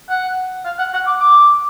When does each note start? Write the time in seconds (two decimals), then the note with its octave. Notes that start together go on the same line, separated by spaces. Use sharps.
0.10 F#5
0.65 F5
0.79 F#5
0.93 F#5
1.07 D6
1.20 D6